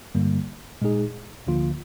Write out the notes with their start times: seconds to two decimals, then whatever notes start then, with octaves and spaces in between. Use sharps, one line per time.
0.15 G2 D3 G3 A#3
0.81 A#2 G#3 D#4 G#4
1.47 D2 D3 F3 A#3 F4